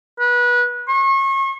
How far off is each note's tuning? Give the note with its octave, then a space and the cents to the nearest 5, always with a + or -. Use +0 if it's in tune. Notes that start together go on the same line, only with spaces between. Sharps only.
B4 -25
C#6 -35